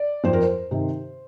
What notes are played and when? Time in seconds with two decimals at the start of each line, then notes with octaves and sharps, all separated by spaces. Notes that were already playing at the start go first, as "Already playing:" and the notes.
Already playing: D5
0.24 F2 C5
0.33 A#4
0.42 C5
0.71 C3 D#3